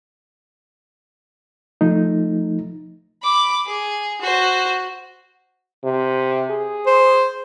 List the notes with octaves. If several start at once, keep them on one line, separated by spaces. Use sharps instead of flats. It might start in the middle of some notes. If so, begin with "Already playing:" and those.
F3 A3 D#4
B5 D6
G#4
F#4 C5
C3
G#4
C5